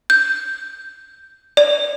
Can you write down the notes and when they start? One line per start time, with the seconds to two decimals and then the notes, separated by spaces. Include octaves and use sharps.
0.10 G6
1.57 D5